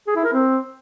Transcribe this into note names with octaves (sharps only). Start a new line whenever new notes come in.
G#4
E4
A#4
C4